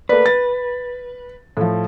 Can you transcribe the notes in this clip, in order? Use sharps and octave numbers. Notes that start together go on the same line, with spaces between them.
A3 A#3 B4 D5
A6
A2 F3